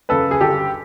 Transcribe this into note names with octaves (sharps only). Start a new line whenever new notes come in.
F#2 C#3 A4 B4
G#4
G1 G4 A4